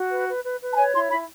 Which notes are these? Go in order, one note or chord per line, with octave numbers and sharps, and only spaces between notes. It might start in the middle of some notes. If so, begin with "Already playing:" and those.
Already playing: F#4
B4
B4
B4
B4
A5
C#5 G#5
E4 C6
E4 B5